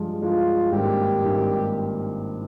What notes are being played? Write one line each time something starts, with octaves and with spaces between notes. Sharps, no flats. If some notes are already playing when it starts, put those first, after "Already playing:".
Already playing: G2 F3 G#3
G2 F3 G#3 F4
G#1 G2 D#3 A#3 G4
G#1 G2 D#3 A#3